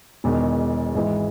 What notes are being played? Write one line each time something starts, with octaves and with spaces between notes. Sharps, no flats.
E1 E2 D#3
G#1 G#2 E3 G#3